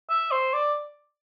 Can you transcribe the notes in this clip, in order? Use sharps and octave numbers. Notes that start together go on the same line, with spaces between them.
E5
C5
D5